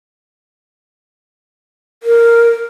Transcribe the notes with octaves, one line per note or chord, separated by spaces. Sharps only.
A#4